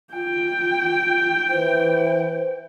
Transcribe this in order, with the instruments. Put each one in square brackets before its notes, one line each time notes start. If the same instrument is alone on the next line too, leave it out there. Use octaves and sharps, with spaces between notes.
[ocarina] F4 [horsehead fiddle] G5
[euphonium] E3 [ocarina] C5